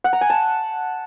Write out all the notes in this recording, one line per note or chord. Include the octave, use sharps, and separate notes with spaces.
F#5
A#5
G#5
A5